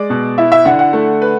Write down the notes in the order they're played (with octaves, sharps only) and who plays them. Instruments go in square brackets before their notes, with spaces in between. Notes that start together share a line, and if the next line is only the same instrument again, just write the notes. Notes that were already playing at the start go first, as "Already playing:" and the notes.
Already playing: [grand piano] G#3 [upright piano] D5
[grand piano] B2
[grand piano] E4 [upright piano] E5
[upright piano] E5
[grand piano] D3 [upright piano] F#5
[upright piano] F#5
[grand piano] A3
B4